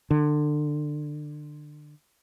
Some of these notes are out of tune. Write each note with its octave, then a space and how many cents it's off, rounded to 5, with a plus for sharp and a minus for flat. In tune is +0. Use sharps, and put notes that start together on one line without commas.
D3 +25